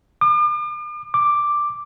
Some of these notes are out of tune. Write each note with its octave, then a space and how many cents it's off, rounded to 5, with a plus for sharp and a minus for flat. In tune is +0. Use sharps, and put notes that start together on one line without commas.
D6 +45
D6 +5